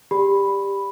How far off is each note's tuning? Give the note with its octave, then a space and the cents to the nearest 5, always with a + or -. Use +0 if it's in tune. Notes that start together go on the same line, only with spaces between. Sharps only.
G4 +15 D5 +0 B5 +0